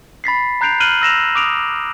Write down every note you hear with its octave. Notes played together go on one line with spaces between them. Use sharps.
B5 A6 B6 C7
A#5 F#6 G6 C7 D7 F7
F6 F#6 D7 D#7 F#7 G7
E6 A#6 E7 F7
D6 D#6 D7 F7